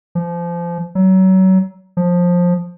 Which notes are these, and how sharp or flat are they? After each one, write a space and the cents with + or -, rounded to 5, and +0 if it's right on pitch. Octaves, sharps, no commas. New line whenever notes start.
F3 -25
F#3 +30
F3 +15